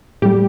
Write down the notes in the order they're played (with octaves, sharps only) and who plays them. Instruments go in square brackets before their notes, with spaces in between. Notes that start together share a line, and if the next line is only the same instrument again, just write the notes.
[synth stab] A2 G3 G4